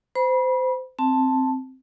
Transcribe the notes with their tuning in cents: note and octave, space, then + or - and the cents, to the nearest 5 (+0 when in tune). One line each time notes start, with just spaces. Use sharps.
C5 -25 B5 -25
C4 +0 A5 +0